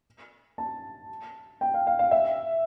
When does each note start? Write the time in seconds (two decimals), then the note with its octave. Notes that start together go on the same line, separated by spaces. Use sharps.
0.58 A5
1.61 G5
1.74 F5
1.87 F5
1.99 F5
2.11 E5